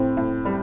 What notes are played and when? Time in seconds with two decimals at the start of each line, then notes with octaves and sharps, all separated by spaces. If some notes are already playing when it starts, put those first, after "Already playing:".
Already playing: A2 C4
0.17 A2
0.45 G3